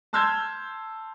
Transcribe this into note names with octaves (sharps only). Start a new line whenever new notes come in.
A5 C6 E6 F6 G6 G#6